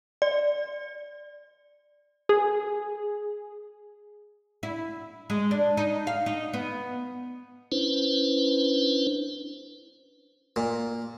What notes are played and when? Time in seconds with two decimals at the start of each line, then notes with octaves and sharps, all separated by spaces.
0.22 D5
2.29 G#4
4.63 E4
5.30 G#3
5.51 D4
5.77 D#4
6.07 F5
6.26 D#4
6.53 B3
7.72 C#4 D4 E4 B4 C5
10.56 A#2